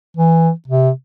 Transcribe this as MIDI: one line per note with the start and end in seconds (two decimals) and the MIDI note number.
0.17 0.51 52
0.68 0.90 48